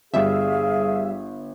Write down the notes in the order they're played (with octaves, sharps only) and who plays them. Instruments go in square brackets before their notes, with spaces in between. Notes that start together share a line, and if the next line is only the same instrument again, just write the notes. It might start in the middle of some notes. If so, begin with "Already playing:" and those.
[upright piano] G1 [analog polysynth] G3 E5 [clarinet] G#4 [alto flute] F5